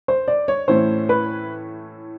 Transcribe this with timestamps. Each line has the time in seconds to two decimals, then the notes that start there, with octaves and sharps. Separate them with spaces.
0.08 C5
0.28 D5
0.48 C#5
0.68 A2 E3 A3 C#4 E4 C5
1.09 B4